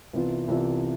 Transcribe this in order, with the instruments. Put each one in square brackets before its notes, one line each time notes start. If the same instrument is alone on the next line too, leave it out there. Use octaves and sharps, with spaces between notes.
[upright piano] C2 C3 E3 B3 F4
C2 C3 E3 B3 F4